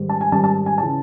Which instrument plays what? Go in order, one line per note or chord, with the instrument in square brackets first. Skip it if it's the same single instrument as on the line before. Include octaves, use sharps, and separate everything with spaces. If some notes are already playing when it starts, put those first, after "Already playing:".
Already playing: [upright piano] G#2 D#3 G3
A5
G#5
G#2 D#3 G3 A5
A5
G#5
C#3 E3 A5